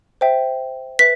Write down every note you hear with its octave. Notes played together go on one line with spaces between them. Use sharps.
C5 E5 G5
B4 E5 B6